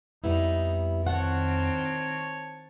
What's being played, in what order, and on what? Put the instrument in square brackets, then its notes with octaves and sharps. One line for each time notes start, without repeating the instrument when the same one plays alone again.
[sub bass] F2 [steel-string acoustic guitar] G3 B3 E4 [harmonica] D#4
[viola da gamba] D#3 C4 [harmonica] C#5 A5 [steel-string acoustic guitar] F#5